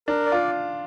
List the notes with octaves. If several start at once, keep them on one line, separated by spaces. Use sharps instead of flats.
D4 A#4
D5
F4